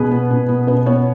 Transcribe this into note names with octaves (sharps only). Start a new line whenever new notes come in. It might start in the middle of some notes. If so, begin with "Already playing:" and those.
Already playing: B2 B3 G#4 B4
B3
B2
B3
B2 B4
B3 C#5